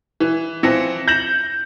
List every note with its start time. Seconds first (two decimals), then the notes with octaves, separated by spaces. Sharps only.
0.20 E3
0.63 E3 F3 C4 A#6 C#7
1.08 G6 A#6 E7 F#7